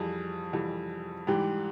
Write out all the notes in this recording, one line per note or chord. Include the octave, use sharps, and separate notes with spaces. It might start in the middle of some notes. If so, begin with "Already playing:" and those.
Already playing: F2 E3 G3 G#4
F2 E3 G3
G#2 E3 G3 G4